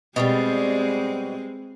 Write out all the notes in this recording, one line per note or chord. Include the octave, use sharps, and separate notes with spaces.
B2 E3 G3 G#3 C4